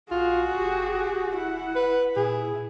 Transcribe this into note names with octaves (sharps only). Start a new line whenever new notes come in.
A#1 F4 F#4 G#4
F#1 G4
D1
E4 F#5
B4
A#2 E4 G#4